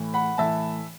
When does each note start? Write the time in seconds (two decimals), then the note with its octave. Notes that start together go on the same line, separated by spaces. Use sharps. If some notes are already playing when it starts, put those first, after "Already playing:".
Already playing: A2 E3
0.14 F#5 B5
0.38 A2 E3 E5 A5